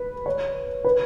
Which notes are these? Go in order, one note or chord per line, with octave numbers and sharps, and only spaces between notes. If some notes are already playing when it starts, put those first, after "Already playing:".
Already playing: B4
C#5
B4